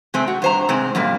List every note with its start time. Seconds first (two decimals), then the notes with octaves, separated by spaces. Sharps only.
0.14 C3 G#3 A3 C4
0.28 F#4
0.42 G2 C5 A#5
0.69 G#2 C3 G#3 C4
0.95 F#2 A#2 G3 A#3